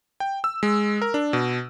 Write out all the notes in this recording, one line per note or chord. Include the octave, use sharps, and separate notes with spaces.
G5
E6
G#3
A#4
D4
B2